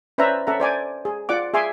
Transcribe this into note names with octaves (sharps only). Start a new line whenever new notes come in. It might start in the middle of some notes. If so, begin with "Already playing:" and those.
C#4 B4 C5 D5 E5 A#5
C#4 A4 E5 F#5 A#5
C5 D5 G#5 D6
G#4
F4 D5 F#5 D6
G#4 E5 G#5 C6 D6